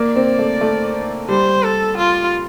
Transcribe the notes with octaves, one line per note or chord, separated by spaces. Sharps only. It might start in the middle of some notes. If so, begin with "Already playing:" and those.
Already playing: A#3 D5
C4
A3
A3
G3 C5
A4
F4